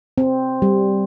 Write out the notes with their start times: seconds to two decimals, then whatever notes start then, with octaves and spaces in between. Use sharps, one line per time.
0.18 C4
0.62 G3